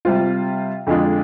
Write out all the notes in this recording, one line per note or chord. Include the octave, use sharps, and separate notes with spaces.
C3 G3 C4 F4
F2 D3 G#3 D4 F4